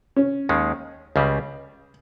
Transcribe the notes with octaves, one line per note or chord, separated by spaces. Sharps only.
C#4
D#2 D#3 G#3
C#2 C#3 G3